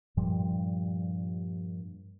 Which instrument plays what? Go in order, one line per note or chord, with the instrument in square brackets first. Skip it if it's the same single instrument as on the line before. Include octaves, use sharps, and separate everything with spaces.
[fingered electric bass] G2 A#2 F3 G3